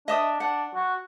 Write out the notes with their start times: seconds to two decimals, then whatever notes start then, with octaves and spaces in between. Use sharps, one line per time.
0.08 D4 D#5 E5 D#6
0.40 D4 F#5
0.75 F#4